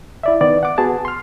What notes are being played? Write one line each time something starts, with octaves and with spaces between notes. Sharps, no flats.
E4 D5 E5
D#3 B3 D5
F#5 D6
B3 F#4 G#4 A5
C6 F6